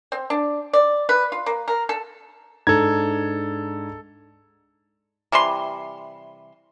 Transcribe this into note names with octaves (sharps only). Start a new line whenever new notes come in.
C4
D4
D5
B4
F4
A#3
A#4
A4
G#2 D4 A4 A#5 G#6
C3 E3 G3 C6